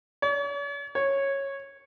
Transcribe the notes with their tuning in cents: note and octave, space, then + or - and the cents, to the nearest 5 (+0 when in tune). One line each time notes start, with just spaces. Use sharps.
C#5 +45
C#5 -10